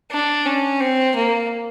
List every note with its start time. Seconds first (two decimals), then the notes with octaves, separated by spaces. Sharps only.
0.11 D4
0.45 C#4
0.80 C4
1.15 A#3